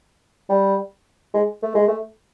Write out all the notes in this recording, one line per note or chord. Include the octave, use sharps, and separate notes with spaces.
G3
G#3
A3
G#3
A3